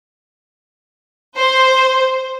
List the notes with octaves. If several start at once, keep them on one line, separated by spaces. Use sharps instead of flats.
C5